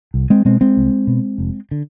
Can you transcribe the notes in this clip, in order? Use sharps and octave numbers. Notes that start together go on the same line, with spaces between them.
C2
G#3 C4
B2 G#3 C4
G#3 C4
C2
B2
F1
D3